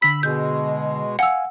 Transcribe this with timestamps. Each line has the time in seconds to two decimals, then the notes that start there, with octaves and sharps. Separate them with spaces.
0.02 D3 B5 E6 B6
0.23 B2 G#3 G6
1.19 F5 F#5 G#5 E6